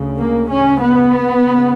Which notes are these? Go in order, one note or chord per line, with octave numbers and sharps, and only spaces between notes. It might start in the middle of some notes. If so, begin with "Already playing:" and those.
Already playing: D2 C#3
A#3
C#4
B3
C#3